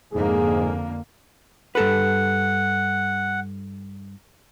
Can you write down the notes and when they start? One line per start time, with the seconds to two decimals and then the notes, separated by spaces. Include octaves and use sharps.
0.13 F2 G#2 D3 A#3 G#4
1.75 G2 A4 B4 F#5